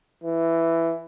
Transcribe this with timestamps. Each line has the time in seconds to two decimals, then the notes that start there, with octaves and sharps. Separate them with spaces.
0.24 E3